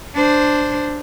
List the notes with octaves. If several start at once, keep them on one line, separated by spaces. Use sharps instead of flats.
D4 C5